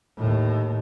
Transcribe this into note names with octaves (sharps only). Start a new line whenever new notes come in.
D#2 A2